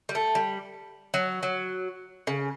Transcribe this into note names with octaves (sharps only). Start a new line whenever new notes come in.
G3
A3
G3
F#3
F#3
C#3